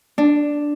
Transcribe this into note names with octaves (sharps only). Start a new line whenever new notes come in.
D4